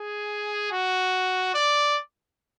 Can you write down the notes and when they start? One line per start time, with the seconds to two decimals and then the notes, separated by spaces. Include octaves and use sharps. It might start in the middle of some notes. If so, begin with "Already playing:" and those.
Already playing: G#4
0.72 F#4
1.55 D5